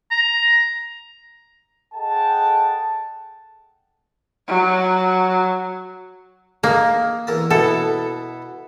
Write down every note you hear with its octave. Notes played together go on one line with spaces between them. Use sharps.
A#5
G#4 A4 D#5 F#5 G5 A5
F#3
A#3 D#4 G#4 A#4
E2 A#4 A5
B2 B3 E4 A4